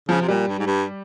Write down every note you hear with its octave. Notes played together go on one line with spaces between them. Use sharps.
C#3 F3
C3
A#2 G3
G2
G#2
G2